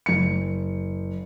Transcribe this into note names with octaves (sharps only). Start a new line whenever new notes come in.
F#1 C#7